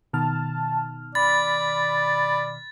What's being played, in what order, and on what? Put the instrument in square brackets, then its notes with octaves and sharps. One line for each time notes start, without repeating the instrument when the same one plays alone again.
[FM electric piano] B2 D#3 F6 [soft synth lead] A5
[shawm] D5 [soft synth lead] B5 [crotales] A6